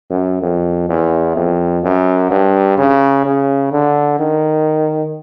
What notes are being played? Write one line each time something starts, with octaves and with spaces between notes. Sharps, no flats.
F#2
F2
E2
F2
F#2
G2
C#3
C#3
D3
D#3